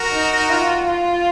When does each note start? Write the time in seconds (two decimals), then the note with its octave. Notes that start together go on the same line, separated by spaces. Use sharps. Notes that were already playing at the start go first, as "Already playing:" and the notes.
Already playing: F#4 A#4
0.13 D#4
0.50 F4
0.87 F4